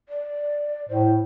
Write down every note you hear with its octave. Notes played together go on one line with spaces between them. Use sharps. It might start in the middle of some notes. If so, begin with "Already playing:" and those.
D5
A2 C5